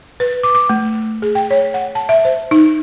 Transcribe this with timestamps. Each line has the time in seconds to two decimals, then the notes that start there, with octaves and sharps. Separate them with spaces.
0.20 B4
0.43 D6
0.55 D6
0.69 A3
1.22 G#4
1.35 G5
1.51 C#5
1.74 F#5
1.95 A5
2.09 E5
2.25 C5
2.51 D#4